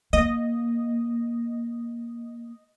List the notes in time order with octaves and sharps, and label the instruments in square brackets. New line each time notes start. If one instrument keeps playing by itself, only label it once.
[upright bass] A#3 [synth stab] D#5